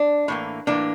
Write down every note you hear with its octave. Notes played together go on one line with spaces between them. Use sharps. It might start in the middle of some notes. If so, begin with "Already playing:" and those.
Already playing: D4
A2 E3 A#3
A2 E3 A#3 D4